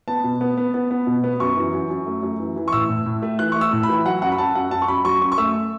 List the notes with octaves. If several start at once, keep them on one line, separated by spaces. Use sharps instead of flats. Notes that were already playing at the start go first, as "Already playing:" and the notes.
B3 A5
B2
B3
B3
B3
B3
B2
B3
F#2 C#6
E3
F#2
F#2
A3
F#2
E3
E3
C#6
A2 E6
A2
A2
A3
E3 F#6
A3 C#6
E6
A2
B5
E3
F#3 F#5
F#2 F#5
B5
F#2 A5
A5
F#2 F#5
F#2 A5
C#6
F#2 B5
F#3 C#6
F#2 C#6
C#6
A3 E6